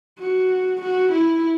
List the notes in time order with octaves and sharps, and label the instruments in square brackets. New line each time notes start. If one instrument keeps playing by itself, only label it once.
[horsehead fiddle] F#4
F#4
E4